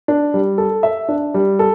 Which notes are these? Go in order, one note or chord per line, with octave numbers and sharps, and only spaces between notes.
D4
G3
A4
E5
D4
G3
A4